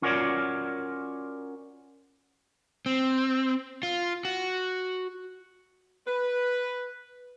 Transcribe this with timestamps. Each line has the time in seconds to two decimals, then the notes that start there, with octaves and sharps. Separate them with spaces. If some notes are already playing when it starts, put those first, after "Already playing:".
0.02 C#4 F4 F#4 A#4 C#5 D5
2.86 C4
3.83 F4
4.25 F#4
6.07 B4